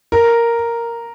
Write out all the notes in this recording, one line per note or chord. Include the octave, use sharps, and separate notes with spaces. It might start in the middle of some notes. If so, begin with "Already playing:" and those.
A#4